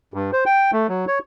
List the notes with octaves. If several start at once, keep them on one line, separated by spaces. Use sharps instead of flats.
G2
C5
G5
A3
F#3
C#5